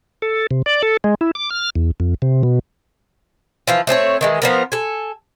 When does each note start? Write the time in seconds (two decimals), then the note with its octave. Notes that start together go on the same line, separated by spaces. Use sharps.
0.22 A4
0.51 C3
0.66 D5
0.83 A4
1.04 G#3
1.21 E4
1.35 D6
1.50 F6
1.76 E2
2.00 F2
2.22 C3
2.43 B2
3.67 E3 F3 F4
3.87 A3 C4 G#4 C#5
4.21 D#3 E3 G#3
4.42 F3 B3 A#4
4.72 A4 G#5